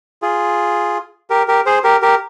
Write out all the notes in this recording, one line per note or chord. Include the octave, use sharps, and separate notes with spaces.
F4 G#4
G4 A#4
G4 A#4
G#4 C5
G4 A#4
G4 A#4